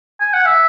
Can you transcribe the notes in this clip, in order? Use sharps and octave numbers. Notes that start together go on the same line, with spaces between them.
G#5
F#5
E5